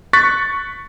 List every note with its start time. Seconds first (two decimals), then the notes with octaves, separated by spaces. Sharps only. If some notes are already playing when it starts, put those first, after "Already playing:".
0.13 C#6 F#6 A6 B6